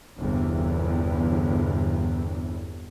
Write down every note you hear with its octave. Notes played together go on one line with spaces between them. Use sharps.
G1 E2 C3